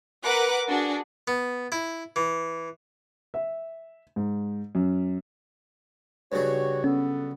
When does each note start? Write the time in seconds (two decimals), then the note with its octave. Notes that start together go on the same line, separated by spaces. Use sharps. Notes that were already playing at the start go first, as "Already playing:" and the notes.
0.24 A#4 B4 F#5 D6 F#6
0.68 D4 F#4 G#4
1.28 B3
1.72 E4
2.16 E3
3.34 E5
4.16 G#2
4.75 F#2
6.32 G2 C#3 F#3 F#4 G4 C#5
6.84 B3 C#4 A4